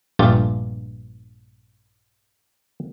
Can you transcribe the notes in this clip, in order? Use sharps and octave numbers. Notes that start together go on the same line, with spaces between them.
A#1 G2 A3 F4 G4 A5